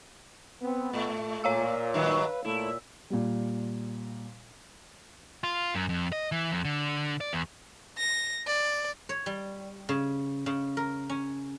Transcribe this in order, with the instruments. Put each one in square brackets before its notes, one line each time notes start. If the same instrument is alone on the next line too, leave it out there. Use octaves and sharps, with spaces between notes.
[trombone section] B3 [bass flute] C4
[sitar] A2 [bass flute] A3
[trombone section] A#2 [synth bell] C#5 F5 E6
[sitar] G2 D#3 F#3 [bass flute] B4
[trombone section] A#2 [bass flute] A3 [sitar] E4
[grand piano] A#2 G3
[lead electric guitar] F4
F#2
F2
D#5
E3
F2
D3
D5
E2
[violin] A#6
D5
[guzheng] C#5
G3
C#3
C#3
A#4
C#4